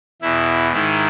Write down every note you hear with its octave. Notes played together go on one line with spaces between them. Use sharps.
E2 B2 E4
G#2 D#3 E4